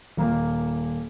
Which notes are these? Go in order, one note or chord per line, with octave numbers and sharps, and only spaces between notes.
D#1 A#3